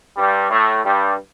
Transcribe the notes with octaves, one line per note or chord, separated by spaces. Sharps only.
G2 G3
A2 A3
G2 G3